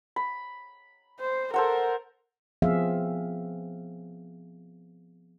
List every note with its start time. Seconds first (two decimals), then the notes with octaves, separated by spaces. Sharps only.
0.16 B5
1.20 C5
1.54 A4 A#4 C5 F#5
2.62 F3 B3 C4 G#4 E5 F5